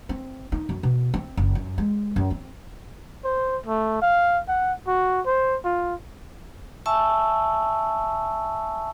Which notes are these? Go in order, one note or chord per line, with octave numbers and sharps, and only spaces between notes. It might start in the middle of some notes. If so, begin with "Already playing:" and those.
C4
D#4
F#2
B2
C4
F#1
F#2
G#3
F#2
C4
C5
A3
F5
F#5
F#4
C5
F4
E5 G#5 A5 C#6 E6